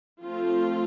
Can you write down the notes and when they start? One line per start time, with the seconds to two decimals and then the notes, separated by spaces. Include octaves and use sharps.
0.22 F3 A3 C4 F4